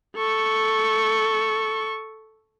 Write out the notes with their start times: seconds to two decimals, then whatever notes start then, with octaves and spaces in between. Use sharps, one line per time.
0.16 A4 C#6